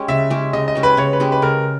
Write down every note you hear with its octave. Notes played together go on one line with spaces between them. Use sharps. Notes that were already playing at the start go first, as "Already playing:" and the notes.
Already playing: G#3 C#4 G4
C#3 E5
G#3 C#4 G4
C#3 D#5
D#5
G#3 C#4 G4
B4
C#3 C#5
B4
G#3 C#4 G4
B4
C#3 A#4